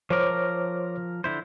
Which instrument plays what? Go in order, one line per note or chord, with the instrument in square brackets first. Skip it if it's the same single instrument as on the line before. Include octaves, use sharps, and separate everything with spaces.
[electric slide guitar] F3 A#4 [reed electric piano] C5 C#5 D6
[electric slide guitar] D3 E4 C5